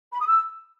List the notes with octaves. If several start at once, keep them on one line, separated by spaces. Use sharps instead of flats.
B5
D#6
E6